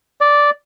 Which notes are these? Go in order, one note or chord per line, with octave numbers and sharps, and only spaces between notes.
D5